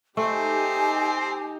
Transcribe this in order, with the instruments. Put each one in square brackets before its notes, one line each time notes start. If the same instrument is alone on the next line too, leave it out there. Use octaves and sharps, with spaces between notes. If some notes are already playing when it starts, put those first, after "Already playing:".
[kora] A3 [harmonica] C4 [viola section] D#4 G4 [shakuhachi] G#5